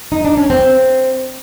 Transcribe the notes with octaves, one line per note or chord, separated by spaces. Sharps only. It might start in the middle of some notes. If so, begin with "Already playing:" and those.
D#4
D4
C#4
C4